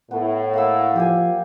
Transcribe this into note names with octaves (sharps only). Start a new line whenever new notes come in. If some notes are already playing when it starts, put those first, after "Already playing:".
A2 B3
A#3 F#5 E6
F3 G4 F5 G#5